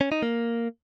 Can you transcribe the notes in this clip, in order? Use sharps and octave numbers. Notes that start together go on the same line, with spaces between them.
C#4
D#4
A#3